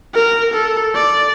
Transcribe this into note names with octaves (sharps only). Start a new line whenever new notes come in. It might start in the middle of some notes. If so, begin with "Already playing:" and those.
A#4
A4
D5